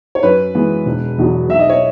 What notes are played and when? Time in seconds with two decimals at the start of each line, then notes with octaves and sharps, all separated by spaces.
0.15 C#5
0.23 F#2 B4
0.55 E3 G#3 B3
0.86 E1
1.18 E2 B2 F#3
1.49 B1 E5
1.59 D#5
1.69 C#5